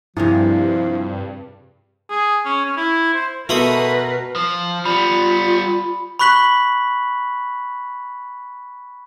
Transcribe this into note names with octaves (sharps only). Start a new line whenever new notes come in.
G2 C3 F3 A#3 E4 G#4
G#4
C#4
C#4
E4
C5
B2 A3 A#4 B4 B5 C6 D#6
F3
G3 B3 F4 B5
B5 C#6 F#6 B6 F#7